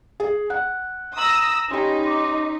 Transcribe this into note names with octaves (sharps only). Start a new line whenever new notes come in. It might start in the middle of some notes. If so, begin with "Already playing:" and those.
G#4
F#5 F#6
A#5 D#6 E6 A#6 F#7
C#4 D#4 G4 G#5 B5 C6
C6 D6